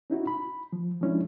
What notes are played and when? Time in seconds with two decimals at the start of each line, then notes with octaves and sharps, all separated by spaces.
0.10 C#4 D#4 E4 F#4
0.27 B5
0.73 F3
1.01 F3 G#3 C#4 D4 E4